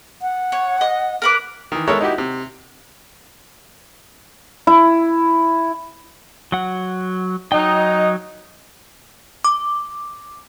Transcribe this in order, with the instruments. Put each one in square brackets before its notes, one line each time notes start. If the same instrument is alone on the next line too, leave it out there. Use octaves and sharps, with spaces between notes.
[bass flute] F#5
[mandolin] C#5
D#5
A#4 B4 D6
[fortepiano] D#3 E3
G#3 B3 A4 A#4 C#5 E5
D#4 E4 F#4 G4
C3
[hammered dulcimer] E4
[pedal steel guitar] F#3 F#5
[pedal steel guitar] F#3 G5 [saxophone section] D#4
[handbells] D6